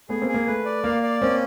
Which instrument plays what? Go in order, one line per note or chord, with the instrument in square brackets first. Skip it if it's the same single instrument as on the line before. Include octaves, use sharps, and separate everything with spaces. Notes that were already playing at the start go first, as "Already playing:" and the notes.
[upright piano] A3 B3 [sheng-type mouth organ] G#4
[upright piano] A#3 C4
[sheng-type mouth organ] G#4
[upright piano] A#3
[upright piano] A3 [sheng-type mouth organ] B4
[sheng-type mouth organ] D5
[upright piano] A#3 [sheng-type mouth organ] F5
[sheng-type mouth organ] D5
[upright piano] A#3 C4 [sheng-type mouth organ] C#4